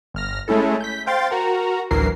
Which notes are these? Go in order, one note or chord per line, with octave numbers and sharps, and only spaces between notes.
G1 F6 A#6
G#3 A3 C#4 E4 A4
G6 B6
C5 F5 G5 C6 A6
F#4 A#4 A#5
A1 D2 E3 F#3 A#4 C7